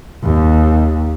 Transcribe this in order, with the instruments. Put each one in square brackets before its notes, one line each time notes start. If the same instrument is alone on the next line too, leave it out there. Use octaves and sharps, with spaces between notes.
[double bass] D#2